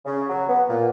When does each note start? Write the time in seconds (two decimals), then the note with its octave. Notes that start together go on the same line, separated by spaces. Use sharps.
0.06 C#3
0.29 F#3
0.48 B3
0.68 A#2